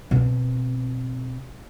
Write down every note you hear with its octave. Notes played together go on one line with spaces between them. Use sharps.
B2 C4